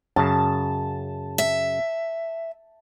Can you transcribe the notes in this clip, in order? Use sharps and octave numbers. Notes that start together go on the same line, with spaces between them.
F#2 C#3 A5
E5